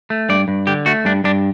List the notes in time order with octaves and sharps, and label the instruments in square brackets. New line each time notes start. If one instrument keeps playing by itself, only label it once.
[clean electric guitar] A3
G2 D5
G2
D3 G4
A3 F#4
G2 D4
G2 D4